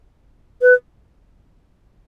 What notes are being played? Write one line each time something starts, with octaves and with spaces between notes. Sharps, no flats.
B4